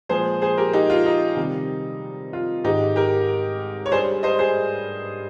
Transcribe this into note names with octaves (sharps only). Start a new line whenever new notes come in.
A#2 F3 G#3 G#4 C5
G#4 C5
G4 A#4
D#4 G4
F4
D#4
C3 D#3 G3
F4
G#2 D#3 G#3 D#4 G4
G4 A#4
C#5
G2 G3 G#4 C5
C5 D#5
G#4 C5